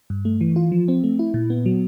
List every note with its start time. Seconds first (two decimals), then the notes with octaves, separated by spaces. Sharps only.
0.10 G2
0.25 A3
0.41 E3
0.56 F4
0.72 F3
0.88 C4
1.04 A3
1.19 E4
1.34 A#2
1.50 B3
1.66 F#3